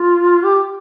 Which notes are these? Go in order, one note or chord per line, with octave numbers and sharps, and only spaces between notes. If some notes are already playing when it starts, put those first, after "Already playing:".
Already playing: F4
G4